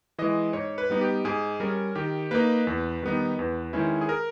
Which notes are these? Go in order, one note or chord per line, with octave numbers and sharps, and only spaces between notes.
E3 G#3 D#5
G#2 C#5
B4
G3 B3 D#4
G4
G#2 G#4
G3 C#4 A#4
D#3 G4
A#3 D#4 B4
E2
D#3 G3 B3 D#4
E2
D#3 G#3 C#4 E4
G#4
A#4